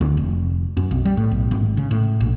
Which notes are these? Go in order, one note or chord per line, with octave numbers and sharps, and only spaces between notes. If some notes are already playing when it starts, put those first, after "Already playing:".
D2
F1
F#2
B1
G3
A2
B1
G#1
C#3
A2
A#1